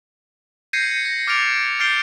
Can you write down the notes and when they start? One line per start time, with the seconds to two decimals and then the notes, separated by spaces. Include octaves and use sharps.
0.73 G6 G#6 A#6 C7 C#7 D#7
1.05 A#6
1.27 D6 F6 A6 C#7 D7 F7
1.80 F6 G6 A6 C7 D7 G7